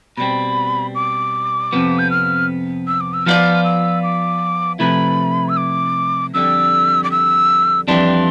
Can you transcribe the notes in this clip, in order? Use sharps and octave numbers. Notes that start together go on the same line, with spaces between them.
B2 G3 C4 B5
D6
F2 C3 F3 B3
G6
F6
E6
D6
E6
F3 B3 F4 B4 D5 F6
E6
D6
C3 F3 A3 E4 B4 B5
E6
D6
F2 D3 G3 E6
D6
E6
F2 E3 G3 D4 C6